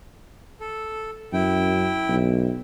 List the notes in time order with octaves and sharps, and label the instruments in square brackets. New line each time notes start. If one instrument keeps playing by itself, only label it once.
[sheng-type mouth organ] A4
[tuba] F#2 [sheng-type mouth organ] E4 G5
[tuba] B1